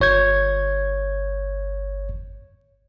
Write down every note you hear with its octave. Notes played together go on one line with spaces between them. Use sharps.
G1 C#5 G6 G#6